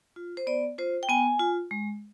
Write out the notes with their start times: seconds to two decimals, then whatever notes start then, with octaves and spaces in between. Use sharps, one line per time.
0.16 F4
0.37 C5
0.47 B3 D5
0.78 F4 C5
1.03 G5
1.09 B3 G#5
1.39 F4
1.71 G#3